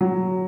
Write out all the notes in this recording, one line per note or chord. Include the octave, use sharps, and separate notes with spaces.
F#3